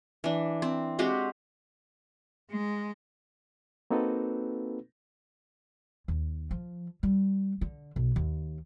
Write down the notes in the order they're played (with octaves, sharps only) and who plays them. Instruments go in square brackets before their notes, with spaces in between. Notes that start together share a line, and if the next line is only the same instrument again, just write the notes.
[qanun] E3 D4
C4
G#3 C4 F#4 G4
[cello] G#3
[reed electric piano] A#3 C4 D#4 F#4 A4 B4
[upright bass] D#2
F3
G3
D3
B1
D#2